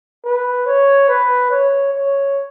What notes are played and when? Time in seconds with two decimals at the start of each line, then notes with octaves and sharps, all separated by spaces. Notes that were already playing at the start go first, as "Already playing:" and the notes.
0.24 B4
0.66 C#5
1.08 B4
1.51 C#5
1.93 C#5